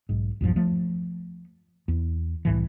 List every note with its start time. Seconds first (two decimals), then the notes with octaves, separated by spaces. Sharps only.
0.09 B1 G#2
0.41 B1 E2 G2 F3
0.56 F3 A3
1.88 E2
2.45 C2 A2 E3